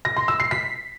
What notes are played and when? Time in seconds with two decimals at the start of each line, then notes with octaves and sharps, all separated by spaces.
0.05 A#6
0.17 C6
0.28 E6
0.40 C7
0.51 B6